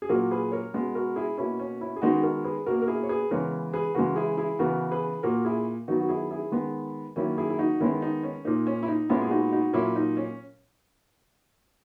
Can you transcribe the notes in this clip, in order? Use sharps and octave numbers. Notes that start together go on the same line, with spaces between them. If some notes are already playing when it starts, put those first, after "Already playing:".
G#4
A#2 F#3 A#3 F#4 A#4
G#4 B4
A#4 C#5
B2 G#3 B3
F#4 A#4
E4 G#4
B2 A#3 C#4 E4
C#4
C#4 E4
G#4
D#3 G#3 B3 D#4 F#4
F#4 A#4
G#4 B4
B2 A#3 F#4 A#4
A#4
E4 G#4
C#5
G#4 B4
C#3 E3 G#3 B3 A#4 C#5
G#4 B4
C#3 E3 G#3 F#4 A#4
E4 G#4
E4 G#4
C#3 E3 B3 F#4 A#4
G#4 B4
A#2 A#3 F#4 A#4
E4 G#4
D#3 F#3 B3 D#4 F#4
F#4
E4 G#4
E4 G#4
D#3 G#3 B3
D#3 F#3 A#3 C#4 E4
E4 G#4
E4
D#4 F#4
D#3 G#3 B3 C#4 E4
D#4
C#4
A#2 A#3 D#4
C#4
E4
D#4
A#2 G#3 B3 C#4 E4
G#4
D#4 F#4
D#4 F#4
A#2 F#3 A#3 C#4 E4
D#4
C#4